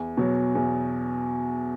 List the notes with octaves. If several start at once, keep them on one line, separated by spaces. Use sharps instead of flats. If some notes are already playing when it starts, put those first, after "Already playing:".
Already playing: E2
B2 F#3
E2